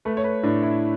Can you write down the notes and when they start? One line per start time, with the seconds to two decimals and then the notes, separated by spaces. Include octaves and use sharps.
0.05 A3 B4
0.17 C#5
0.24 B4
0.43 A2 D4
0.62 E4